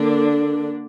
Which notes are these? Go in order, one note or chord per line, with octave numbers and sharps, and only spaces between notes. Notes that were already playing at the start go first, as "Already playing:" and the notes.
Already playing: D3 A#3 D4